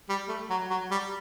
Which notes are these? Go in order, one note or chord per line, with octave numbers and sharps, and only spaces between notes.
G3
A3
F#3
F#3
G3